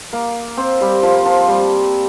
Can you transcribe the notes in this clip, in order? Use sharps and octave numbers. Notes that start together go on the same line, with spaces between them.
A#3
C4
G3
F3
F3
G3